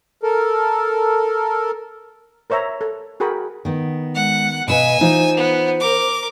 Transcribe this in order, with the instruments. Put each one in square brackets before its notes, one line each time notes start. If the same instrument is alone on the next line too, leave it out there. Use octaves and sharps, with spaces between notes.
[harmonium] A4 A#4
[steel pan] A#4 C5 C#5 E5 A#5
A4
F#4 G#4 A#4 G5 B5 C#6
[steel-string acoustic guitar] D#3 B3
[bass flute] G#3 [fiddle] F#5
[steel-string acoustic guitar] B2 B4 F5 [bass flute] D#5 [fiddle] G#5 E6
[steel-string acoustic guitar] E3 D#4 F4 [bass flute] C5
[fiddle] B3
A#4 D6